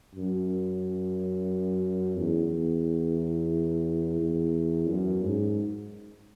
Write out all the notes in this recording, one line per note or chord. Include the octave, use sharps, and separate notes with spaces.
F#2
E2
E2
F#2
G#2